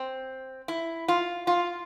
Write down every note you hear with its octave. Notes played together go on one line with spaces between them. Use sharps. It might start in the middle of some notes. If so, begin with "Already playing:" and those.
Already playing: C4
E4
F4
F4